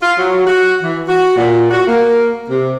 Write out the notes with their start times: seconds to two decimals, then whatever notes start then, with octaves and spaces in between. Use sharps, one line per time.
0.02 F4
0.18 F#3
0.47 F#4
0.83 E3
1.08 F#4
1.37 A#2
1.71 F#4
1.87 A#3
2.49 C3